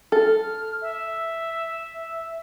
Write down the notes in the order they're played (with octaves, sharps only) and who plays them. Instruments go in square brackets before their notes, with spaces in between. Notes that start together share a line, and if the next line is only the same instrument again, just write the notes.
[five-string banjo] A4 [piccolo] F6
[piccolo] E5